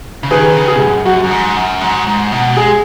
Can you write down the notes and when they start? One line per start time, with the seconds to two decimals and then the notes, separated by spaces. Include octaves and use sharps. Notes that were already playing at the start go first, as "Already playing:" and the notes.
0.23 C#3
0.31 D#3 G#4 B4
0.56 C#3
0.68 G#4
0.81 F#2
1.05 F#2 F#4
1.24 F#2
1.31 G#2
1.56 F#2
1.81 G#2
2.07 G#2
2.32 B2
2.57 G#3 G#4